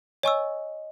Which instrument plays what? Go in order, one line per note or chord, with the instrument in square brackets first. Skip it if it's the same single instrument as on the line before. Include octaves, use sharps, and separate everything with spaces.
[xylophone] C#5 G#5 C#6 E6 [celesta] D#5